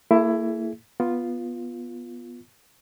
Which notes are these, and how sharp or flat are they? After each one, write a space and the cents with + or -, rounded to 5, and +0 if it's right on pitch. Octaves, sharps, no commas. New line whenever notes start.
A#3 -30 E4 +15 G#4 +30
B3 -10 F4 +0